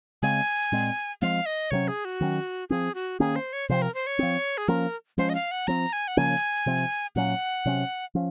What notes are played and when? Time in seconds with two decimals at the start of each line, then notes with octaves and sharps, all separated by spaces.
0.22 C#3 G#3 C4 G#5
0.72 A#2 G#3 C4
1.22 F3 G#3 C4 F5
1.46 D#5
1.71 C3 F#3 C#4 C#5
1.88 G#4
2.05 F#4
2.21 D#3 F#3 C#4
2.70 F3 C4 G#4
2.95 F#4
3.20 D#3 A#3 C#4 G#4
3.36 C5
3.53 C#5
3.69 C3 F3 C4 C5
3.82 A#4
3.94 C5
4.07 C#5
4.19 F3 C4
4.58 G#4
4.68 F3 A#3 C#4 A#4
5.18 F3 G#3 C#4 C5
5.29 D#5
5.35 F5
5.51 F#5
5.67 F3 C4 A#5
5.93 G#5
6.08 F#5
6.17 C#3 F3 A#3 C#4 G#5
6.66 C3 F3 C4
7.16 A#2 F#3 C#4 F#5
7.66 C3 F#3 C#4
8.15 F3 C#4